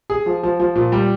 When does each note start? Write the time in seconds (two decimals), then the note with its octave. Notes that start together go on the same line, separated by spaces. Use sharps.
0.10 G#4
0.26 F3
0.43 F3
0.60 F3
0.75 A#2
0.92 G3